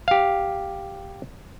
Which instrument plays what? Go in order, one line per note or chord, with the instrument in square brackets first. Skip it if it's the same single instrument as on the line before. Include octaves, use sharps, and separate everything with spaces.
[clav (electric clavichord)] G4 F5